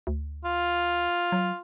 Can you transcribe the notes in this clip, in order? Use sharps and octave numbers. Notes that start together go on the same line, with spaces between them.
D2
F4
F#3